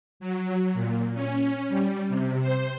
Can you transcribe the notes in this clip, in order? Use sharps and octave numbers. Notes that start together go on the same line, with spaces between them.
F#3
A#2
C#4
G3
C3
C5